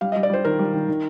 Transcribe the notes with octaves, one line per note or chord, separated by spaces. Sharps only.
G3 F5
D#5
G3
D5
G3 C5
D#3 A#4
G3
D#3
D#3